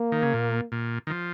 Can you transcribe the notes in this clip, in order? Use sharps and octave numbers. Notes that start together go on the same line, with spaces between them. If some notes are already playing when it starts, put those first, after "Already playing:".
Already playing: A#3
D#3
C#3
A#2
A#2
D#3
F3